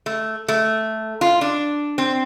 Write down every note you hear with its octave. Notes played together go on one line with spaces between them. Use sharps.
A3
A3
F4
D4
C4